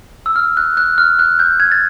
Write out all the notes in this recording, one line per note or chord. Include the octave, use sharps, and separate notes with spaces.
E6
F6
F#6
F#6
F6
F#6
G6
G#6
A6